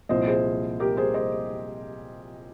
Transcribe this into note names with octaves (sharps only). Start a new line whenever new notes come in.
C2 A#2 F3 C5 D#5
G#4 C5
G4 A#4
G#4 C5
C5 D#5